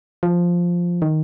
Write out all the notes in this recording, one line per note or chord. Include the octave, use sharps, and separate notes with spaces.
F3
D#3